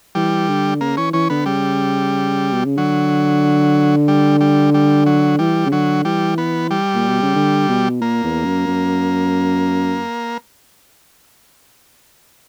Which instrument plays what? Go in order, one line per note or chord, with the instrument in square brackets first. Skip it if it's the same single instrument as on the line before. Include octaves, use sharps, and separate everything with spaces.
[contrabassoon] E3 [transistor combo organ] G3
[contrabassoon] D3
[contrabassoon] C#3 [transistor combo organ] A#3
[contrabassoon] E3 [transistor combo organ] C#4
[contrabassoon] E3 [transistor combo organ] C#4
[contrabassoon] D3 [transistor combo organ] B3
[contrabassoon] C#3 [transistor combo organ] G3
[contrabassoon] B2
C#3
[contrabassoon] D3 [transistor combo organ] F#3
[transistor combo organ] G3
G3
G3
F#3
[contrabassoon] E3 [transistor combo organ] G3
[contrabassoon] C#3
[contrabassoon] D3 [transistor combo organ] F#3
[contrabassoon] E3 [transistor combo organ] G3
[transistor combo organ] B3
G3
[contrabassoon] A#2
B2
C#3
D3
B2
[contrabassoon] A#2 [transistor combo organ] A#3
[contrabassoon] E2
F#2
F#2